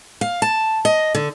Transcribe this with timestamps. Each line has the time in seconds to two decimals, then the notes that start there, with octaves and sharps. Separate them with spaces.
0.21 F5
0.42 A5
0.85 D#5
1.15 D3